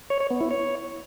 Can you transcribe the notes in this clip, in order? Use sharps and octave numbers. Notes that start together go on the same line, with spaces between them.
C#5
C#5
B3
E4
C#5